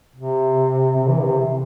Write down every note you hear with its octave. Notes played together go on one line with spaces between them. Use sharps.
C3
C3
E3
C3